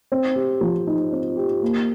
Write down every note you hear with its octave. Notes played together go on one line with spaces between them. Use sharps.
C4
G4
F3
D#4
C4
G4
A#3